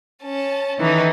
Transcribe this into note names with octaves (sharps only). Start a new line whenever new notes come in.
C#4 A5
D#3 E3 D#4 A4